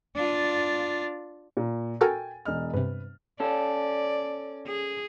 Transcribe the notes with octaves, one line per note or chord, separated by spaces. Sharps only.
D4 F4
A#2
F#4 A4 A#4 G5 G#5 A6
E1 D#5 F6
G2 C3 B4
C#4 A4 D5
G#4